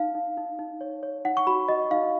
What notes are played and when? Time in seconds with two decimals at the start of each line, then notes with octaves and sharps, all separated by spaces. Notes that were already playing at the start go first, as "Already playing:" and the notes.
Already playing: D#4 F5
0.15 D#4
0.37 D#4
0.59 D#4
0.81 C#5
1.03 C#5
1.25 D#4 F#5
1.37 C#6
1.47 F#4 B5
1.68 F#4 D#5
1.91 D#4 F5